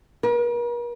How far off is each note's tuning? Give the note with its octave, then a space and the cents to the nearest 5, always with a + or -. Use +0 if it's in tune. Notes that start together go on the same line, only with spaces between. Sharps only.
A#4 +45